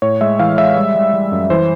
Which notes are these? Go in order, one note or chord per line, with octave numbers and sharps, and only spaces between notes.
A2 C#5
G#3 E5
E3 F5
G#3 E5
G3
G3
G3
F#2
E3 C5